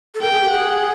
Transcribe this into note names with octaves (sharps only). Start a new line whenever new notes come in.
A4
A#4 G5
G#4
G4
G#4 F#5